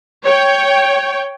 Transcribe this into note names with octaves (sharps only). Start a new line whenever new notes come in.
C#5 G5